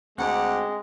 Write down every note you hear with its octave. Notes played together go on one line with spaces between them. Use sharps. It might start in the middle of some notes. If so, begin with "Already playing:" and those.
D2 G#3 C4 G4 F#5